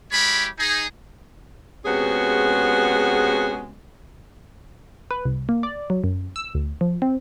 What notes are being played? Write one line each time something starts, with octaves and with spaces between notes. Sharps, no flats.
G#3 E4 G4 C#5 B5
D#4 G#4
C3 G#3 B3 C#4 F#4 G#4
B4
C2
A#3
D5
F#3
F#2
E6
D2
F3
C4